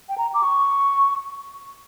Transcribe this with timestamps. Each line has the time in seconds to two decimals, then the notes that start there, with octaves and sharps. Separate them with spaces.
0.09 G5
0.18 A#5
0.34 D6
0.43 C#6